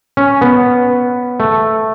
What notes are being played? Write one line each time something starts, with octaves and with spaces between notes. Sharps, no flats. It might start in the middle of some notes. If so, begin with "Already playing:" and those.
C#4
B3
A3